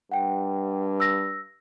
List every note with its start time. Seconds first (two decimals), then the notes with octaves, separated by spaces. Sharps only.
0.12 G2 F#5 G5
1.00 E6 A#6